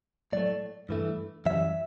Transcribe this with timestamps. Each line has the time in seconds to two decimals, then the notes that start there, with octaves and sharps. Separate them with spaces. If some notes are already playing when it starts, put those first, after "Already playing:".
0.33 A2 F#3 A3 D5
0.89 G2 E3 A3
1.46 F#2 E3 G3 E5